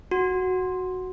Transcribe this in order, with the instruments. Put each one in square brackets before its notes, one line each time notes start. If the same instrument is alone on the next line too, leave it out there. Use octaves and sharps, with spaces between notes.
[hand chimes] F#4